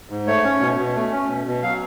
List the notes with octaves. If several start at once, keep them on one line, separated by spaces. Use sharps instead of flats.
G#2
A3 C#5
C#4
B2
B2
A3
C#4
B2
B2
F#3 F5